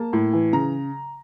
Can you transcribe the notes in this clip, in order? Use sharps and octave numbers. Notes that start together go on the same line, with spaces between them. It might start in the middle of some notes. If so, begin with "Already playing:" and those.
Already playing: A#3 A5
A2
E3
C#3 A#5